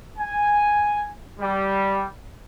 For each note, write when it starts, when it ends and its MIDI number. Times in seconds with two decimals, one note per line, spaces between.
0.18 1.06 80
1.40 2.06 55